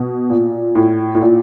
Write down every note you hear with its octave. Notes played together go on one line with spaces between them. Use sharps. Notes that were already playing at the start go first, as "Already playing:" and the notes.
Already playing: B2
A#2
A2
A2
A#2